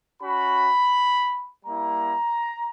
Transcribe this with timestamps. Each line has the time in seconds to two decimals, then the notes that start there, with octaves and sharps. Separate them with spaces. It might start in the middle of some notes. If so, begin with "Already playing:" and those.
0.21 C#4 F#4 B5
1.65 G3 A#3 E4 A#5